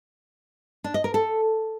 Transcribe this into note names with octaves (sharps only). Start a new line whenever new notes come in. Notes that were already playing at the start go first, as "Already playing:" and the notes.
D4
D#5
A#4
A4